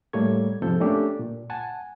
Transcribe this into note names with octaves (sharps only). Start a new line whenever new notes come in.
A2 G3 A3 A#3 C#5 G#6
F2 G#2 C3 F3 A4 G6
A3 A#3 C#4 D4 G4 A4
A#2
F#5 G#5 A5